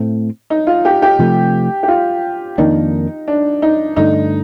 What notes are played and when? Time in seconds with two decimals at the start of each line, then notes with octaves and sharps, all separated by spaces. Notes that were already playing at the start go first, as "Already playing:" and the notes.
Already playing: A2 A3 C4
0.50 D#4
0.67 F4
0.85 G4
1.02 G4
1.19 C3 F3 A3
1.83 G4
1.88 F4
2.58 F2 D#3 A#3 D4 D#4
3.28 D4
3.62 D#4
3.96 G2 D3 A3 D4 D#4